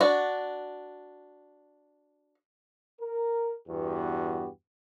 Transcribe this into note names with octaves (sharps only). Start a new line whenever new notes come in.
D4 F#4
A#4
E2 G2 B3 F#4 G4